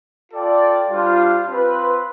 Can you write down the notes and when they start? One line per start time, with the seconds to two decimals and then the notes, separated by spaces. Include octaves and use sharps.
0.32 F4 A4 D5 G5
0.89 G3 D4 F4 C5 F5
1.48 C4 F4 B4